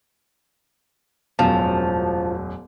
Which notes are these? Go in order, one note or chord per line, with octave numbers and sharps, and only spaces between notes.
E1 A1 F#2 F3 A5